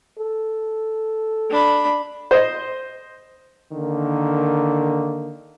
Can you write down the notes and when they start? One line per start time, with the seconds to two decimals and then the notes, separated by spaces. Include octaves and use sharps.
0.19 A4
1.50 D4 B5
2.31 C5 D#5
3.72 D3 D#3 A#3